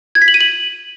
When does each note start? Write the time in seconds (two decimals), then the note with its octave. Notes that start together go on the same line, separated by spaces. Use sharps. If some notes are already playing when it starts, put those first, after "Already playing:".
0.15 G#6
0.22 B6
0.28 F#7
0.34 D#7
0.41 F#7